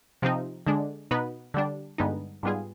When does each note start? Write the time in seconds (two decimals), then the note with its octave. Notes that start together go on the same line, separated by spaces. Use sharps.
0.22 C3 F3 C4 D#4
0.66 D3 G#3 D4
1.11 B2 B3 D#4 B4
1.54 D3 G3 D4
1.98 G2 D3 G#3 B3 D#4
2.43 G#2 G3 B3 F4 G#4